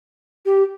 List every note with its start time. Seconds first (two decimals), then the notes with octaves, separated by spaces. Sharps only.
0.45 G4